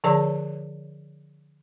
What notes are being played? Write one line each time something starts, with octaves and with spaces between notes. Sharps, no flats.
D3 F3 G#4 C#5 D5 A5